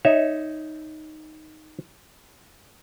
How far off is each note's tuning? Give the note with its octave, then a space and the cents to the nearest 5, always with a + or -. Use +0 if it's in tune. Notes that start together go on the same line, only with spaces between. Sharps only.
D#4 +0 C#5 +0 E5 -15